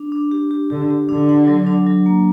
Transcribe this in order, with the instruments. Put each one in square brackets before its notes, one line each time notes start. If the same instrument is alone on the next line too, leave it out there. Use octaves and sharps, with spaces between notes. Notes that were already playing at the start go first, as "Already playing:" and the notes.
Already playing: [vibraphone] D4
D4
G4
G4
[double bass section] D3 [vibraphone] G4
[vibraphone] G4
[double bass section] D3 [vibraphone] D4
[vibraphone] F#5
F#3
D4
F#3
A#3